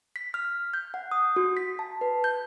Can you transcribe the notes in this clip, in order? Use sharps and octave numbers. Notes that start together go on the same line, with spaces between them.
B6
F6
G6
F#5
D#6
F#4
B6
A5
B4
G6